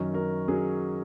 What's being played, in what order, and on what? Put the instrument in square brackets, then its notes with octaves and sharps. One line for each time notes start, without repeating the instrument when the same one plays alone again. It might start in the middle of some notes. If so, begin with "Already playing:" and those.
Already playing: [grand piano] F#2 D#3 F#3 C#4 F#4 A#4
F#4 A#4
D#3 F#3 C#4 G#4